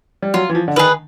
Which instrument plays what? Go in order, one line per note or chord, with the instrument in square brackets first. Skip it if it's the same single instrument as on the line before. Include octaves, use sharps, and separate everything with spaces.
[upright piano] G3
[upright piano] F#3 [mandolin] F4
[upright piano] E3
F3
D3
[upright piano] D#3 [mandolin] G#4 B4